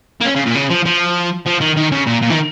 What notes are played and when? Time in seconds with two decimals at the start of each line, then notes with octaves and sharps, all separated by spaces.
0.21 A#3
0.25 C#4
0.36 C#3
0.46 A#2
0.55 C#3
0.70 F3
0.86 F3
1.47 F3
1.61 D#3
1.77 D#3
1.92 C#3
2.07 A#2
2.22 A#2
2.30 D#3